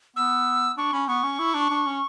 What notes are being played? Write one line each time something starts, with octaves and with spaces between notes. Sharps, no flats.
B3 E6
D4 C#6
C#4 B5
B3 C#6
C#4
E4
D4
D4
C#4